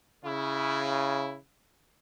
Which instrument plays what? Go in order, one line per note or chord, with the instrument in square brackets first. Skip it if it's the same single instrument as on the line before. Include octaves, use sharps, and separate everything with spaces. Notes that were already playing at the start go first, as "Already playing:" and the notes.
[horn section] C#3 E4